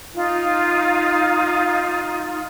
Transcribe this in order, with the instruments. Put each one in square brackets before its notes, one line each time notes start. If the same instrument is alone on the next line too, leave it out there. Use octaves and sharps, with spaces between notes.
[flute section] D#4 F4